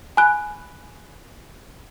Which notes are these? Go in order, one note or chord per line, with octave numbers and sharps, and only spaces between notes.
G#5 B5 F#6